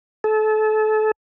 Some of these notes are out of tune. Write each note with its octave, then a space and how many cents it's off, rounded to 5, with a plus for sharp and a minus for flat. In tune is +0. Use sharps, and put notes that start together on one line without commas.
A4 -30